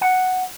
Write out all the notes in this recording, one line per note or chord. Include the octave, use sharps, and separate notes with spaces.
F#5